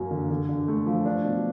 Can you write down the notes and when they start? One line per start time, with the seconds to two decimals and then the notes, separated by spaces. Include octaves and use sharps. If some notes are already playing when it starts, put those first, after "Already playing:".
Already playing: F#2 F#3 A#3
0.11 D3
0.30 D3
0.49 D3
0.68 A3
0.86 F3
1.05 D4
1.25 B2